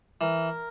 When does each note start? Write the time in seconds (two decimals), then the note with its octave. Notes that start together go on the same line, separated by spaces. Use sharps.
0.21 E3 A#4